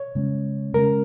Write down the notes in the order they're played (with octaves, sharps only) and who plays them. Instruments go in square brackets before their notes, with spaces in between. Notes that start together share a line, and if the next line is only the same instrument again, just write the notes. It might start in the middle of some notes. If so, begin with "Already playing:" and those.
Already playing: [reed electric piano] C#5
[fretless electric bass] C#3 G#3 C#4
[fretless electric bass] C#3 G#3 C#4 [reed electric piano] A#4